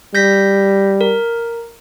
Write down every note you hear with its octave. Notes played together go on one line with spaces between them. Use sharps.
G3 G6 A#6 B6
A#4